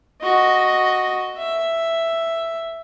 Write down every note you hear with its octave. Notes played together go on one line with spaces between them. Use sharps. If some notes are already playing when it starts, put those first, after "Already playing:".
F#4 D#5
E5